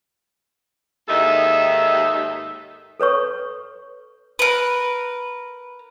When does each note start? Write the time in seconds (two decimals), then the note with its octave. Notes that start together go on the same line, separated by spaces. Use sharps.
1.08 D#2 G#2 D#3 D#4 A4 E5
3.00 A4 B4 C#5 C#6
4.39 A#4 B4